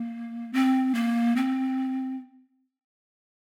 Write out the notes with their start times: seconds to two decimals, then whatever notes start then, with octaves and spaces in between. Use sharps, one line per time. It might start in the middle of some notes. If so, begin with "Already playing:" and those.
Already playing: A#3
0.53 C4
0.95 A#3
1.36 C4